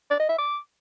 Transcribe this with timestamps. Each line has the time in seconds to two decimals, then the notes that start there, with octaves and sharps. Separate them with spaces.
0.10 D5
0.20 D#5
0.29 E5
0.38 D6